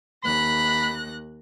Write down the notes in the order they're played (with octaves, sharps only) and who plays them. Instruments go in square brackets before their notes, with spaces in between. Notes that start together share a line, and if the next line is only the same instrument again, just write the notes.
[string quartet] D#2 F#6 A#6 [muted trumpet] B5